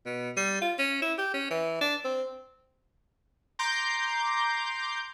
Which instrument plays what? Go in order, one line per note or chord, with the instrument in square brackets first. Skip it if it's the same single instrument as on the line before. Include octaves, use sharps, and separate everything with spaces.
[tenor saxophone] B2
G3
F4
C#4
E4
G4
C#4
E3
D4
C4
[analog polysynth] A#5 C6 D6 G6